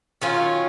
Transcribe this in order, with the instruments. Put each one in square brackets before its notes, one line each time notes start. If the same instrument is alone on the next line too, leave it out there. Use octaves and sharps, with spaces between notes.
[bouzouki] D#3 F#3 C#4 F4